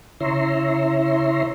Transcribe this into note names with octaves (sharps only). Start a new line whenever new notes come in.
C#3 E4 C#5 E5 A#5 C6